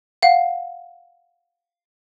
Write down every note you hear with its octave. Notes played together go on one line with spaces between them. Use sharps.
F5 F#5